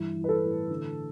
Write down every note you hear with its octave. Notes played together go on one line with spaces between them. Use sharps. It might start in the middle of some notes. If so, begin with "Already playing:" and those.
Already playing: G2 E3 E4
E3
B4
A4
A2
D3